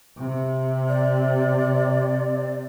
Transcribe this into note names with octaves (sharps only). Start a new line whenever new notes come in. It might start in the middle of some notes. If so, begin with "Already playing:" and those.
C3
D5